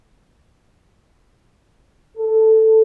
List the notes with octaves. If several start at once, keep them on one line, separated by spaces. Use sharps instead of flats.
A4